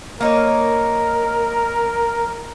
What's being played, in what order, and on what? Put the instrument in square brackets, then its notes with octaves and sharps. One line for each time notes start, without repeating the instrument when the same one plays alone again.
[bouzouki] A#3 D#4 C#5 [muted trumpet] A#4